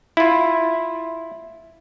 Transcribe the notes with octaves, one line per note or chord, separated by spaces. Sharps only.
E4 F4